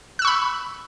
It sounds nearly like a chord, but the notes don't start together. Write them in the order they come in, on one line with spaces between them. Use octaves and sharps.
F#6 E6 C#6 B5